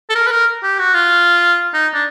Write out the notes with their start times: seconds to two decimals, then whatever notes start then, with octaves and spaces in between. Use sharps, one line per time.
0.09 A4
0.15 A#4
0.27 B4
0.31 A#4
0.63 G4
0.79 F#4
0.94 F4
1.73 D#4
1.94 D4